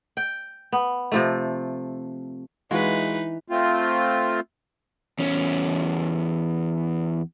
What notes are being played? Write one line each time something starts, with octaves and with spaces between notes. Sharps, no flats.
G5
B3
C3 F3 A3
E3 G#3 D#4 F4 F#4 B4
A3 C4 F4
E2 C#4